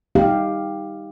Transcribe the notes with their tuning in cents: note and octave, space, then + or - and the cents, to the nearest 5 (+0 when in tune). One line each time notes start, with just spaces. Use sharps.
D#4 +15 G4 +10 F5 -5